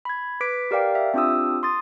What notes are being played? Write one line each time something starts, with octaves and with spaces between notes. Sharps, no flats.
B5 G#6
B4 D6 B6 D7
G4 A#4 D5 F5 G5
E5
C4 D4 F4 G4 D#6 E6
C6 D#6 A6